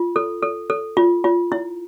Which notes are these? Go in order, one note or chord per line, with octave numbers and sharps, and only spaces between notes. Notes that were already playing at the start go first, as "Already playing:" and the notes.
Already playing: F4
A4
A4
A4
F4
F4
E4